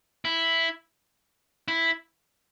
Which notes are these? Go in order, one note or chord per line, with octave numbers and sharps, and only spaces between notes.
E4
E4